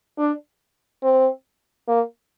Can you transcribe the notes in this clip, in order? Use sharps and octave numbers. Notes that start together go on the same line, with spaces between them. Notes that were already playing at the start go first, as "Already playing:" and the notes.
D4
C4
A#3